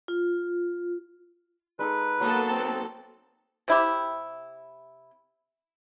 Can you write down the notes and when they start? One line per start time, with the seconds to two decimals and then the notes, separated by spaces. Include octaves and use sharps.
0.08 F4
1.79 G#3 D#4 A4 B4
2.20 F#3 A#3 B3 A4 D#6
2.49 C4
3.68 C3 E4 G4